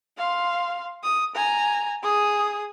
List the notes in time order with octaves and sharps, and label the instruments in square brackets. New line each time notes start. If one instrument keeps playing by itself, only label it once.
[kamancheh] F5 C6
D#6
G#5 A#5
G#4 D#6